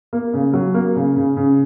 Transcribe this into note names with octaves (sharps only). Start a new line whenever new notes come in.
A#3
C#3
F#3
A#3
C#3
C#3
C#3